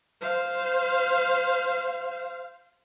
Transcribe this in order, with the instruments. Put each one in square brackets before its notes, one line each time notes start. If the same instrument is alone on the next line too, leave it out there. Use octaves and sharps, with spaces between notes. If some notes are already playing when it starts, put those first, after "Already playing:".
[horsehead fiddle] C5 F5